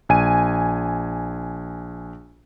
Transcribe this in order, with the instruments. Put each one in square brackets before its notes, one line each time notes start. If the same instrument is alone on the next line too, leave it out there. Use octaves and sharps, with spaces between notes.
[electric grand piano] A#1 G#5 D#7